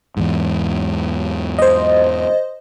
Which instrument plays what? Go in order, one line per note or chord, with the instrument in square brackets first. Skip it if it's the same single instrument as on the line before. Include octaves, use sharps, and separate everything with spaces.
[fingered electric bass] E2 G#2
[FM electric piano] C5 D#5